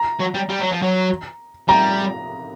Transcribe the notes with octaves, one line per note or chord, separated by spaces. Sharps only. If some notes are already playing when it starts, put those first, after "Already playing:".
Already playing: A#5
F#3
G3
G3
F#3
F3
F#3
G3 A#5